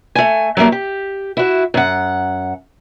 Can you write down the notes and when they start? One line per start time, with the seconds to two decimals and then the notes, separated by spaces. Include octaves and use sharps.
0.15 A3 G#5
0.57 F#3 G3 A3 A#3 A#4
0.72 G4
1.37 E4 F#4
1.74 F#2 F#5